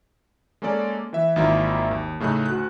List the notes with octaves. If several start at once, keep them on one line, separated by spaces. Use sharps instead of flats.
G#3 A#3 C#4 A4 D5
E3 E5
G#1 D#3 A#3 E4 F4 E5
D#2
A2 C#3 A3 D#4 F#6
D2 F#4 F#6